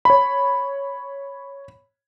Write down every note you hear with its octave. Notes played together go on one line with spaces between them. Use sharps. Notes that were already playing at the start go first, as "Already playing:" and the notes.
C#5 B5